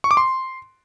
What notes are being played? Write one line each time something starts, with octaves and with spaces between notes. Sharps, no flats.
C#6
D6
C6